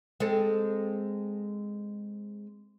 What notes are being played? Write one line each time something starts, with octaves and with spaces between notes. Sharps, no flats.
G#3 C4 A4